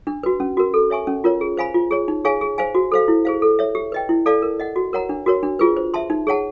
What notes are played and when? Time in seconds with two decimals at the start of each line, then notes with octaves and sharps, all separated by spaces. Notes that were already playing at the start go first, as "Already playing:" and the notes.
0.07 D4
0.23 F#4 B4
0.40 C#4
0.57 F#4 A#4
0.74 A4
0.90 C#5 E5 G#5 C#6
1.07 C#4
1.24 F4 A#4 C#5
1.41 G#4
1.57 C5 F5 G#5 B5
1.74 F4
1.91 G#4 C#5
2.08 D#4
2.25 G#4 C#5 F5 G#5
2.41 G#4
2.58 C5 F5 G#5
2.75 F#4
2.92 A4 C5 F5
3.08 E4
3.25 G#4 C5 F5
3.42 A4
3.59 C#5 E5
3.75 G4
3.92 B4 D#5 G5
4.09 E4
4.26 A4 D5 F5 A5
4.42 A#4
4.60 D#5 F#5
4.76 F#4
4.93 A#4 C#5 F#5 A#5
5.09 D4
5.26 F#4 A#4 C#5
5.43 D4
5.59 F4 G#4 B4
5.77 C5
5.94 E5 A5 C6
6.10 D#4
6.27 G#4 C#5 F#5 A5